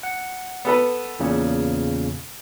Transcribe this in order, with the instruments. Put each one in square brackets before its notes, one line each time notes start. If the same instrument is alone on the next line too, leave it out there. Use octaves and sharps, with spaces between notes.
[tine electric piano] F#5
[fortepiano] B3 A4 B4
[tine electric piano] E2 A#2 C#3